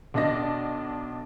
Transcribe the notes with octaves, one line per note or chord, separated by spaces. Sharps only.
B1 D4 D5 D#5 A#6